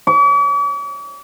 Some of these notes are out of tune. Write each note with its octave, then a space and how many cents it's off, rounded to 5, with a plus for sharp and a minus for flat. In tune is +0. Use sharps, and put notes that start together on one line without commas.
D6 -45